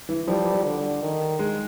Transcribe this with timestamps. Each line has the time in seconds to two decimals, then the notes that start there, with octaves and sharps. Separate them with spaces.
0.09 E3
0.28 F3 G3
0.65 D3
1.02 D#3
1.39 G#3